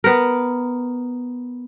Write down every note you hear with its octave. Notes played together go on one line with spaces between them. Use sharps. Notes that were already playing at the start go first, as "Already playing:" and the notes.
B3 A#4